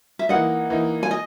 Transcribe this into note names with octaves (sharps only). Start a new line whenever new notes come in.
E5
E3 A#3 D#4 D#5 F#5
E3 A#3 D#4
G#5
D#5